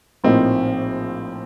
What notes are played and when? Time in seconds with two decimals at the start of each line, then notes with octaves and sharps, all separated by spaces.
0.24 A#1 A2 F3 A#3 C4 D#4